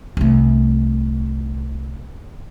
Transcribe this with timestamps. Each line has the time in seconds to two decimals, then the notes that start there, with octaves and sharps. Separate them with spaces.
0.17 C2 A3